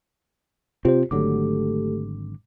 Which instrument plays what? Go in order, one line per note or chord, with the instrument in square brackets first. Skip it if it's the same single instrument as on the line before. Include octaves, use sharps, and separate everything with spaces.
[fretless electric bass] C3 C4 [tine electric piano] F4 G4 C5
[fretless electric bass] G#1 D3 F#3 [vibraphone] A3 G4 A4 [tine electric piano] D6